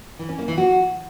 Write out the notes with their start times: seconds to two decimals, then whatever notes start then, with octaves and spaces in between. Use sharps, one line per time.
0.19 E3
0.29 C#4
0.38 A#3
0.48 E3
0.58 F#4